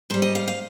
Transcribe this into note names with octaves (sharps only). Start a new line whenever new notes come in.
G#2 G3 C5
D#5
F5
F5